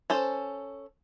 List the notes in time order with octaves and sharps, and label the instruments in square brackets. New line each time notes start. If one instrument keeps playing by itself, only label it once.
[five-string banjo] C#4 A4 C5